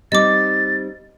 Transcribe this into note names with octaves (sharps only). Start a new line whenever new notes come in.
G3 C4 D#4 D#5 D6 A6